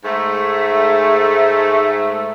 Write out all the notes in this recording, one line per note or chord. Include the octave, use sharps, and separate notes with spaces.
G#2 A3